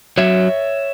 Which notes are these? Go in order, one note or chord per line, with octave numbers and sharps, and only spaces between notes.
F#3 C#5 E5